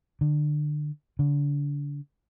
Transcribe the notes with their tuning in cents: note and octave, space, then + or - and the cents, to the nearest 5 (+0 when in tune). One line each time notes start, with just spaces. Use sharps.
D3 +25
D3 -35